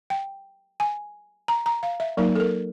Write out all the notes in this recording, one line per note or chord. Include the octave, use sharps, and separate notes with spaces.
G5
G#5
A#5
A#5
F5
E5
F#3 A#3 D#4 A#4
A4
A#4